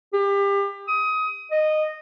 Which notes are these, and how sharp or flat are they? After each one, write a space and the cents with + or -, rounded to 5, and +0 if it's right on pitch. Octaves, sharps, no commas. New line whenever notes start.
G4 +30
D#6 +25
D#5 -15